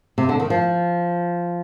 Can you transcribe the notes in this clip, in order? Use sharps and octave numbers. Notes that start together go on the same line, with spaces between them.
C3
D3
D#3
F3